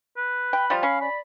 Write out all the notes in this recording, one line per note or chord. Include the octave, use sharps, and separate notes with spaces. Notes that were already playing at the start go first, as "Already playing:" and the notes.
B4
G5 B5
F3 G3 F4
C#4 F5 B5
D5 B5